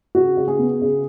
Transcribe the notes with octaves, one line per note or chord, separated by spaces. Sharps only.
C#3 F#4
C#3
G#4
B3
C#3